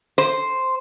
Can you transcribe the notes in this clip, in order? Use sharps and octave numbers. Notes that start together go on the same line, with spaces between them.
C5